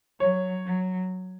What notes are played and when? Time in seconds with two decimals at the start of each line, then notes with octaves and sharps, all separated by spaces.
0.20 F#3 C#5
0.66 F#3